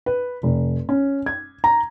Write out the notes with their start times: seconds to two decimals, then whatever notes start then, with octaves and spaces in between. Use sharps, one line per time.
0.06 B4
0.43 F1
0.89 C#4
1.26 G#6
1.64 A#5